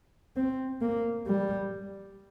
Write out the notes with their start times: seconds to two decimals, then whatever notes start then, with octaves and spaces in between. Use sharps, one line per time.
0.36 C4
0.81 A#3
1.27 G3